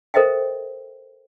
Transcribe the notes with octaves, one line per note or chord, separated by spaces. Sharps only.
A4 A#4 C5 D#5 E5 G5